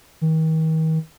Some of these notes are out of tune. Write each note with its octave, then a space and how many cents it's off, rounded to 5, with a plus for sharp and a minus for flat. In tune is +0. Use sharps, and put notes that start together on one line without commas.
D#3 +40